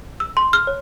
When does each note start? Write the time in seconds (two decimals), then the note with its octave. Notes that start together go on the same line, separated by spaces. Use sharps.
0.20 E6
0.37 C6
0.53 F6
0.67 C#5